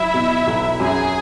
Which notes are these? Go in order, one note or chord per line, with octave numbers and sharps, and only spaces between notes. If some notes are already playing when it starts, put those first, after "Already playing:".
Already playing: F#3 E4 E5
B2
B1
F#2 G#4 G#5